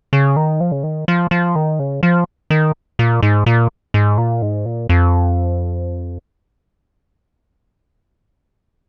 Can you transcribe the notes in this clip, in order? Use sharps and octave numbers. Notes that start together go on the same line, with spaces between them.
C#3
D#3
F3
C#3
D#3
F3
F3
D#3
C#3
F3
D#3
A#2
G#2
A#2
G#2
A#2
G#2
A#2
F2